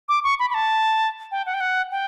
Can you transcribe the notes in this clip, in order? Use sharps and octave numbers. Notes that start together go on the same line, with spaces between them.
D6
C#6
B5
B5
A5
G5
F#5
G5
F#5
G5